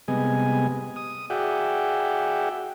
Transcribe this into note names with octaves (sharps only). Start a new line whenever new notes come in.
C3 G3 G#3 B3 D#5 G#5
D#6
F#4 G#4 D5 E5 F#5 G5